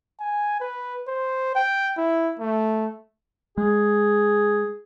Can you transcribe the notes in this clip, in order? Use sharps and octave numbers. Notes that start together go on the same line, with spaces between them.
G#5
B4
C5
G5
E4
A3
G#3 G#4